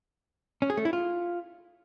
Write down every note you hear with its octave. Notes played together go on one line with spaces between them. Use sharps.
C#4
G#4
A3
E4
F4